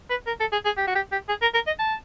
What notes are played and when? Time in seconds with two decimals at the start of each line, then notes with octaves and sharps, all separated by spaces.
0.10 B4
0.27 A#4
0.40 A4
0.52 G#4
0.65 G#4
0.77 G4
0.87 F#4
0.95 G4
1.12 G4
1.29 G#4
1.42 A#4
1.54 A#4
1.67 D#5
1.79 A5